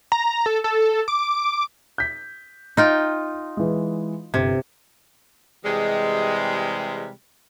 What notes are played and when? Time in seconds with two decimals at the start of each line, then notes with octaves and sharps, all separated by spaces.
0.12 A#5
0.46 A4
0.64 A4
1.08 D6
1.98 G6 B6
2.77 D#4 F4 G5
3.57 E3 G#3
4.34 G1 C3 G#6
5.65 C3 E3 G3 G#3